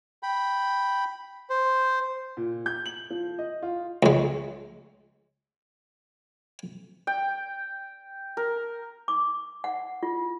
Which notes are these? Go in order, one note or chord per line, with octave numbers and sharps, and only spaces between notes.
G5 B5
C5
A#2
G6
F#7
F3
D#5
F4
C#2 G#3
G5
A#4
D6
F#5
F4